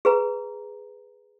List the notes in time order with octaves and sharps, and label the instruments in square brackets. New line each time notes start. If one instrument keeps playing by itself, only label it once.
[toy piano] G#4 B4 A#5